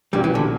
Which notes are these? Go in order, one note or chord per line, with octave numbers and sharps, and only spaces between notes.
A#1 A#2 G3 A#3 C#4 F#4
E3
D3